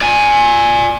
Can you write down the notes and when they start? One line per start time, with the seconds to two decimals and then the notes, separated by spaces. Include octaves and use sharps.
0.01 D5 G#5